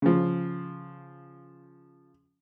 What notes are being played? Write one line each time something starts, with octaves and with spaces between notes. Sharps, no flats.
C#3 F3